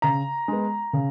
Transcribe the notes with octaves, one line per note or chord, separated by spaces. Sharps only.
C#3 A#5
G#3 B3
C#3